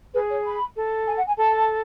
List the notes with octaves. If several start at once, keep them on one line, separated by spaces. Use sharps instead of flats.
G#4 B4
C#5
B5
A4
G#5
F#5
G#5
A4 A5